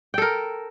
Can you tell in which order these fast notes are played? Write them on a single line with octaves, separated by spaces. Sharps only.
G5 A4 A#4